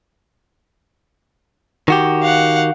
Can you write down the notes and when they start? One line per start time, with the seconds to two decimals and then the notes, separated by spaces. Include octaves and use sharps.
1.88 D#3 F#4 G4
2.22 F5 F#5